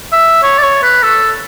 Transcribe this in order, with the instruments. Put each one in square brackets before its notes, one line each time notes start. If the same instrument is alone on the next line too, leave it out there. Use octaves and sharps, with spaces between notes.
[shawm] E5
C#5
D5
C#5
B4
A4